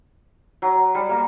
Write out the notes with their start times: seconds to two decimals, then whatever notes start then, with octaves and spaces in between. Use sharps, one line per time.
0.62 F#3
0.95 G3
1.09 A#3